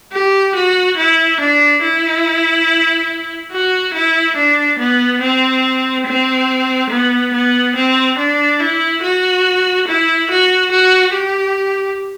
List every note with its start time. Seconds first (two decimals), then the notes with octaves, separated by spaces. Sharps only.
0.12 G4
0.55 F#4
0.97 E4
1.40 D4
1.83 E4
3.52 F#4
3.94 E4
4.37 D4
4.79 B3
5.21 C4
6.06 C4
6.90 B3
7.34 B3
7.76 C4
8.18 D4
8.60 E4
9.02 F#4
9.88 E4
10.30 F#4
10.72 F#4
11.14 G4